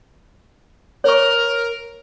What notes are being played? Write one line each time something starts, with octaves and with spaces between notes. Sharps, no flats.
A#4 C#5 C#6